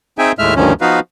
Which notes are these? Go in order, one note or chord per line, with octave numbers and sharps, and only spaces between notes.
C4 D#4 G#4 E5 G5 G#5
D#2 A2 G#3 A3 E5 F6
D2 G2 D#3 F3 C#4
F3 B3 D#4 F#4 B4 F5